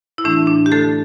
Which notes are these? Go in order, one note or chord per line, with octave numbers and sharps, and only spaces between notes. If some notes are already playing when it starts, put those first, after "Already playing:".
E4
A2 E3 A3 D4
D4
G4
D3 A3 A4